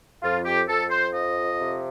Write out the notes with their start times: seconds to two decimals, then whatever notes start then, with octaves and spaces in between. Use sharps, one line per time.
0.22 F2 F4
0.45 G4
0.67 F2 A4
0.90 C5
1.13 F3 D#5
1.59 C3